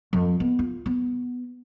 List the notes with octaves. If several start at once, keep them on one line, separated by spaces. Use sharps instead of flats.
F2
B3
F4
B3